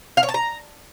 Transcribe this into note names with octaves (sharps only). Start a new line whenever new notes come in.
F5
C#5
A5
A#5